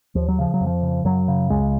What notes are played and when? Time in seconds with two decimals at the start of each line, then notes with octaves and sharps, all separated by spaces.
0.15 D#2 F3
0.29 F#3
0.39 C#3 F3
0.54 F#3
0.61 F2
0.67 F3
0.82 C#3
1.05 F#2 F#3
1.28 C#3
1.50 C#2 G#3